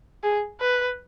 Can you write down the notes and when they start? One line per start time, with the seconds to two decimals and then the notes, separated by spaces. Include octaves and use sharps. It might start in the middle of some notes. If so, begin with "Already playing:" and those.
0.24 G#4
0.61 B4